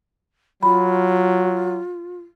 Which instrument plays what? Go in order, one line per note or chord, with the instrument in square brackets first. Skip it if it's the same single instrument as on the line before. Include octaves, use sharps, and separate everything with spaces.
[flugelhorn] F#3 [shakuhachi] F4 [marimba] B5